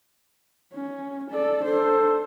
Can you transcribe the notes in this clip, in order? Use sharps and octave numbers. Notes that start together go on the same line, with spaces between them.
C#4
A4 D5
D4 A4 C5